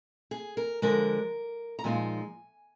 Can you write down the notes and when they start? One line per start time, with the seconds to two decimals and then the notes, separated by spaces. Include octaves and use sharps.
0.31 G#4
0.57 A#4
0.82 D3 F3 G#3 A#4
1.79 A#5
1.84 A#2 F3 G#3 D#4 G#5